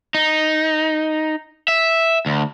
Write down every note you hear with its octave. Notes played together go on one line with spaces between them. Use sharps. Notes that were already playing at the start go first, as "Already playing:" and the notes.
D#4
E5
D2